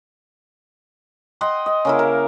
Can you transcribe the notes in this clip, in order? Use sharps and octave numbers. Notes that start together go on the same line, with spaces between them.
D#5 F#5 G5 C6
D#5
C#3 A#3 E4
A#4